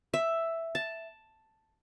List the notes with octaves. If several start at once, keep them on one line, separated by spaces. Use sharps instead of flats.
E5
A5